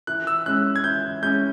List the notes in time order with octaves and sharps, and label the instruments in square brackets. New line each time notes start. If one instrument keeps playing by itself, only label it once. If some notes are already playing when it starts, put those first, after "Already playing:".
[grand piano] E3 [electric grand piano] F#6
[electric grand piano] E6
[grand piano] G#3 C#4 [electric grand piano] F#6
[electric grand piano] G#6
[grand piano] E3 [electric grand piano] G6
[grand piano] G#3 C#4 [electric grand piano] G6